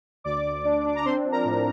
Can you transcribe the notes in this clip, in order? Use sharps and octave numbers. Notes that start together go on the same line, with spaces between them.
D2 D5 D6
D2
D4
D4
A#5
C4 C5 C6
F3
A#4 A#5
A2